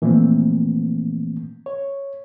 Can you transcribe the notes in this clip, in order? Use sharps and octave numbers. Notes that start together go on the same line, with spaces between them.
A#2 E3 F3 A3 A#3 C4
C#5